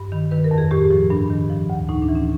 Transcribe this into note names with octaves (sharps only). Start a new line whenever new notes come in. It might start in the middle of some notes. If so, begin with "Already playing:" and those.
Already playing: G2
D#3
D#3 B4
A#4
F2
G#4
A2 G4
F3
G2 D4
D#3
F3
D2
A2 D#4
D4
E3
C#4